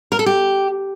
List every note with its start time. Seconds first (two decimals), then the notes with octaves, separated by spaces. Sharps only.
0.12 A#4
0.19 A4
0.26 G4